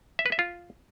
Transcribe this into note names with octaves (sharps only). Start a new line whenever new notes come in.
E5
B4
E5
F4